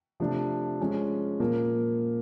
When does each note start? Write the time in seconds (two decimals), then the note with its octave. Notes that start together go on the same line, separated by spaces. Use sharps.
0.20 C3 F3 A3 D4
0.80 F3 G#3 C#4
1.40 A#2 F3 A#3